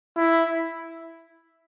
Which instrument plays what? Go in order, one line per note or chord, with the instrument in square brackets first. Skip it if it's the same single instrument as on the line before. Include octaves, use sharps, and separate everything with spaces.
[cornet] E4